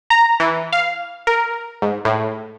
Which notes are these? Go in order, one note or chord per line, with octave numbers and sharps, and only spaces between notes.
A#5
E3
F5
A#4
G#2
A2